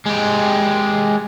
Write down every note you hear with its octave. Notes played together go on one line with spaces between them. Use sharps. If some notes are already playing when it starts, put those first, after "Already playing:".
G#3 G4